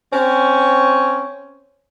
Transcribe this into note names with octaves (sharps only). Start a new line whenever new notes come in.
C4 C#4